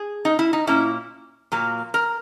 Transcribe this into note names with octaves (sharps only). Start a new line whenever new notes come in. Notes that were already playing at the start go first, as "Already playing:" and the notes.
Already playing: G#4
D#4
E4
D#4
A#2 F#3 A#3 C#4 E4
A#2 F#3 A#3
A#4